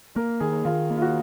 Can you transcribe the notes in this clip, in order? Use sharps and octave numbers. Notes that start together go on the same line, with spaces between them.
A#3 A#4
D#3 G#4
D#3 F4
A#3
F4
F#4